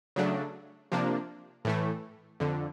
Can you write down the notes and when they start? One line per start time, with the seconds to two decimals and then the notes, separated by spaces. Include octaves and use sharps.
0.16 C#3 F#3 A3 D4
0.92 C3 F3 A#3 D4
1.65 A2 E3 A3
2.40 F2 D3